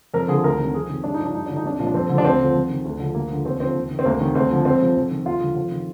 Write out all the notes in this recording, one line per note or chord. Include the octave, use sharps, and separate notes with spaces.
F2 A#4
D3 F3 G#4
D2 A#4
C3 D#3
F2 G#4
C3 D#3
G2 D4
F3 D#4
D4
G2 D#4
D3 F3 D4
D#4
C2 D4
A#2 F3
D4
F2 C4
D3 F3
D4
D2 C4
D3 F3
F2
D#3
D2
D3 F3
D2 A#3
D3 F3
D#2 C4
D3 F3 C4
D#2
D#3
C4
D2 A#3
C3 D#3
D2 C4
D3 F3
F2 C4
C3 F3
F2
D#3
D#2 F4
D3 F3
F2 F4
D#3